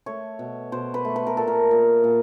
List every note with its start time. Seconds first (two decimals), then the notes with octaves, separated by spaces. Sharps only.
0.06 A3 C#5
0.39 B2
0.72 B2 C5
0.94 B4
1.05 A3
1.16 B4
1.27 A#4
1.37 A#2 A4
1.48 A#4
1.71 A#2
2.04 A#2